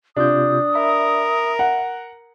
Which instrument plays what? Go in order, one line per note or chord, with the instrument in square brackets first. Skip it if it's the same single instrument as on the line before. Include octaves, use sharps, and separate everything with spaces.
[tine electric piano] C3 F4 G6 [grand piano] D4 [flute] D#6
[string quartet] A#4 [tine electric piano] E5 B5
[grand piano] F#5